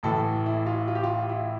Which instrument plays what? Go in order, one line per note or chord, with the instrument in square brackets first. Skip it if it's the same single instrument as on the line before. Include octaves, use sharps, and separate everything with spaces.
[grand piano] A1 A2 E3 A4
E4
F4
F4
G4
F4
E4